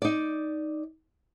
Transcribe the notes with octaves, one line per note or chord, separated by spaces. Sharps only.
D#4 D5